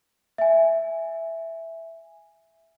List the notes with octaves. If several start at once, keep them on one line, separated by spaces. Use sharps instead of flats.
E5 G#5